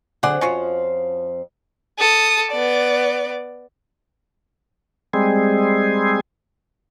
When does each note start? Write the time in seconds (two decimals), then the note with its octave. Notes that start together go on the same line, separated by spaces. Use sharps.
0.23 D3 F#3 C4 G#4 D5 F#5
0.41 F2 F3 C#4 F4 F#4
1.99 A4 D#6
2.51 B3 D5
5.14 G3 G#3 C4 G#4